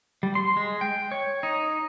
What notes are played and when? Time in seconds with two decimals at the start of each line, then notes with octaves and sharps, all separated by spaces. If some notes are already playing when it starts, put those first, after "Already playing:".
0.23 G3
0.35 C6
0.57 G#3
0.81 G5
1.12 C#5
1.43 D#4